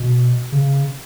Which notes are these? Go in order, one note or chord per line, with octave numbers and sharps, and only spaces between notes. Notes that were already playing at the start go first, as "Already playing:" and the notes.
Already playing: B2
C#3